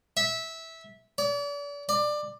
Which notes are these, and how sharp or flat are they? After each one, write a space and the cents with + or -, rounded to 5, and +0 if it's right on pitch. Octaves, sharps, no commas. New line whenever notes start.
E5 -15
D5 -40
D5 +20